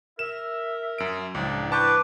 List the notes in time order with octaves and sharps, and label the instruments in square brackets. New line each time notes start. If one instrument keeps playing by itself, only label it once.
[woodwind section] A#4 E5 [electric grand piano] E7
[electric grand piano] F#2 D7
[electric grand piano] C#2 [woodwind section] A2 F3 D4
[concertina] B4 [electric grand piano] A5 C#6 G6 [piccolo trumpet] D6